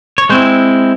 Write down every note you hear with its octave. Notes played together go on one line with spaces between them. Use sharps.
C#5
G#3 C4 E4 C5